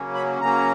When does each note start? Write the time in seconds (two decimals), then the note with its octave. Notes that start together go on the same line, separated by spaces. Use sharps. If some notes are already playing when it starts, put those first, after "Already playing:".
Already playing: C#3 F#3 A#3 C#4
0.15 B5
0.40 C#3 F#3 A#3 C#4 A#5